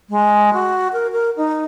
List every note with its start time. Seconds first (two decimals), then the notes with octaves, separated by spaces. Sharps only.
0.10 G#3
0.53 F#4
0.93 A#4
1.12 A#4
1.37 D#4